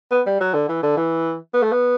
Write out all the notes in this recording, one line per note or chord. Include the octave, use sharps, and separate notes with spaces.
B3
G3
F#3
D3
E3
D3
E3
B3
A3
B3